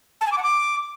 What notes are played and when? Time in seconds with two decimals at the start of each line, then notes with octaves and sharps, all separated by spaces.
0.21 A5
0.26 G#5
0.32 D6
0.37 F#5
0.43 D6